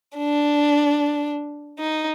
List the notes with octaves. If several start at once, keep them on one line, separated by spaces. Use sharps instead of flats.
D4
D#4